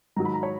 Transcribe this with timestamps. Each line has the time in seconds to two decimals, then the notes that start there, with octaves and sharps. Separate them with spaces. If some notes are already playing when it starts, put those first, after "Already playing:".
0.16 G#2 D#3 F#3 A#5
0.25 B5
0.34 A#5
0.43 C#5